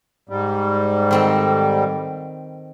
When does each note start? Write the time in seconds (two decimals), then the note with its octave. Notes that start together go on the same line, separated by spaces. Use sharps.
0.29 G#2 G3
1.11 D#3 C4 A4